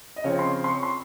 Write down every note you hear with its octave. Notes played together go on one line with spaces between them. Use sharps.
D#5
C#3 F3 C4 C#5
C6
C6
C#6
C6